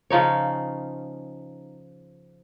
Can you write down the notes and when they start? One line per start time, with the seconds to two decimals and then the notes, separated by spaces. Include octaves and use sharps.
0.10 C#3 F3 D#4 C#5